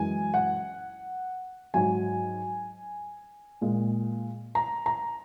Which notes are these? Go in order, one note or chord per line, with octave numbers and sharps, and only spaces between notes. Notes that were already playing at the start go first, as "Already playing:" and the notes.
Already playing: F#2 E3 G#3 G#5
F#5
G#2 F#3 G#5
A#2 G#3
A#5
A#5